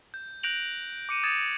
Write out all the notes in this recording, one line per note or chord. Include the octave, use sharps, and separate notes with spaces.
G6
F#6 G6 A#6 D7 F7 F#7
D6 C#7 D#7
D#6 G#6 A6 C#7 D7 E7